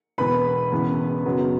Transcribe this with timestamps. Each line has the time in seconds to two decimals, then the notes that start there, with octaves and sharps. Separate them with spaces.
0.18 E1 E2 B2 B4 B5
0.71 E1 E2 C#3 E3 B3
1.25 F#1 F#2 F#3 B3